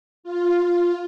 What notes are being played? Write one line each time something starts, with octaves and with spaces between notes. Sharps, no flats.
F4